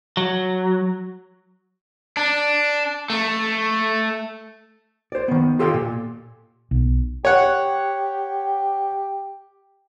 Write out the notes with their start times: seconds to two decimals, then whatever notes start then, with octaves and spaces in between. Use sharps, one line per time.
0.17 F#3
2.17 D4
3.10 A3
5.12 C5 D5
5.28 D#3 B3
5.59 F4 G4 A4 D#5 F5 G5
5.74 A#2
6.71 B1
7.25 G4 C#5 F#5